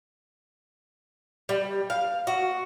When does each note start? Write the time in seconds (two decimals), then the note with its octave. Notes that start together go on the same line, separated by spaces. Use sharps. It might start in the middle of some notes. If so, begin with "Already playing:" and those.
1.49 G3
1.90 F5
2.27 F#4